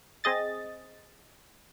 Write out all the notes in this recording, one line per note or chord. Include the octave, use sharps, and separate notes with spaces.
C4 G#4 D#5 A6